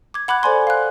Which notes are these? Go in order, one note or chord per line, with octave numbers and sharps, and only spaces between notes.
D6 G#6
F#5 B5 D6 F#6 G#6
A4 C5 D5 G#5 C6
F5 F#6